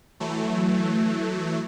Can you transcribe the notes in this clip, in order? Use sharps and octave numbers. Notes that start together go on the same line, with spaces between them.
E3 F#3 A3